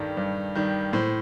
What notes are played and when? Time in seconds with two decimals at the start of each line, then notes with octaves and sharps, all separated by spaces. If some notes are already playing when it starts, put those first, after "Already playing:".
Already playing: G2 D#3 G3 A4
0.17 G2
0.55 D#3 G3
0.93 A2 C5